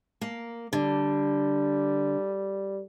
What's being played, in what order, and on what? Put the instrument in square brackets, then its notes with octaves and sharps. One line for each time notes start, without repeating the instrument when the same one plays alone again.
[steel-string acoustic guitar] A#3
[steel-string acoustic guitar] D3 [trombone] G3